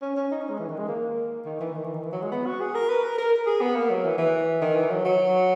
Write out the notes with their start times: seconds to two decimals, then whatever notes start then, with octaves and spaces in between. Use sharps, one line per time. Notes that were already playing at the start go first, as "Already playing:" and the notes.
0.02 C#4
0.16 C#4
0.31 D#4
0.41 C#4
0.50 G#3
0.59 E3
0.69 D#3
0.79 G#3
0.88 A#3
1.45 D#3
1.60 E3
1.75 D#3
1.84 E3
1.94 D#3
2.03 E3
2.12 F#3
2.22 G#3
2.32 B3
2.46 F#4
2.61 G#4
2.75 A#4
2.89 B4
3.04 A#4
3.18 A#4
3.47 G#4
3.61 B3
3.75 A#3
3.90 F#3
4.05 E3
4.18 E3
4.62 D#3
4.76 E3
4.90 F#3
5.05 F#3